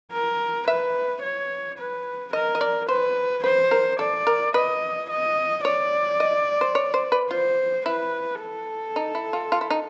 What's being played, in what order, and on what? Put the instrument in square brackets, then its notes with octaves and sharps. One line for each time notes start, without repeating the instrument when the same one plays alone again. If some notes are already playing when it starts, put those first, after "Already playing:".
[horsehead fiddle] A#4
[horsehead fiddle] B4 [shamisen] E5
[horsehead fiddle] C#5
B4
[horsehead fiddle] A#4 [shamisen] D#5
[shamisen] D#5
D5
[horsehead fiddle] B4 [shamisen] C5
[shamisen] B4 [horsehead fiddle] C5
[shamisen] A#4
[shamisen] A4 [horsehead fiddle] D5
[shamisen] A#4
[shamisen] B4 [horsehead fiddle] D#5
[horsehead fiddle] D#5
[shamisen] C#5 [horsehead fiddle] D5
[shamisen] D#5
C5
C#5
C5
B4
[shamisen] F4 [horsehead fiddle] C5
[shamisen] E4 [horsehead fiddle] B4
[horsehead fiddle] A4
[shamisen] D#4
E4
F4
F4
E4
D#4